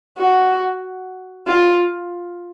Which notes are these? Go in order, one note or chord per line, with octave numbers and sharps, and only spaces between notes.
F#4
F4